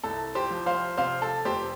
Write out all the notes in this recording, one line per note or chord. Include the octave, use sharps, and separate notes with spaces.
C2 A4
G4 C5
F3
C5 F5
C3 C5 F5
A4
F1 G4 C5